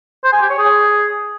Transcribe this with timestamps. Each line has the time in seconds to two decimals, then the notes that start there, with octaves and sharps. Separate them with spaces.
0.24 C5
0.33 G#5
0.41 G4
0.50 C#5
0.58 G#4